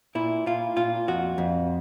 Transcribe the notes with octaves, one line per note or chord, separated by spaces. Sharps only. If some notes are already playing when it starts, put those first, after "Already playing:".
A#2 E4
A#2 F4
A#2 F4
F2 F#4
F2